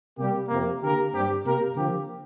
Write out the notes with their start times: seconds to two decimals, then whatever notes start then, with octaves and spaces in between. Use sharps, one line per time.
0.17 C3 G3 A#3 G4
0.49 F2 C3 A#3
0.80 D3 A#3 G4 A#4
1.11 G2 G3 C4 G4
1.43 C3 A#3 G4 A#4
1.75 D3 F3 A#3 G4